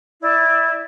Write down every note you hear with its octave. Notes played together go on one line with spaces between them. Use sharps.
E4 D5